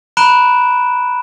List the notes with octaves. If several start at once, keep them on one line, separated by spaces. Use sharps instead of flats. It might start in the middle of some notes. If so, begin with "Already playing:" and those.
A#5 B5 F#6 D7 E7 G7